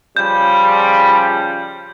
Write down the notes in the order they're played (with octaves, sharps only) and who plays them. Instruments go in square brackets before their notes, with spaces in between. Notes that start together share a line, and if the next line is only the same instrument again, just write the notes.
[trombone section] C#3 F3 G3 [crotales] G6